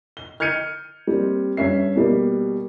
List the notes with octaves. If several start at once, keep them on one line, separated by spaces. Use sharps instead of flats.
G7
F6 G6 G#6 C#7 D#7
G3 A#3 C4
G2 C#4 E5 C7
B2 G3 A#3